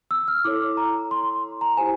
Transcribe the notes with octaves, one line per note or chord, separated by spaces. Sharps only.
E6
F6
E4 A4 C#5 D6
A#5
C6
A#5
E4 G4 C5 G#5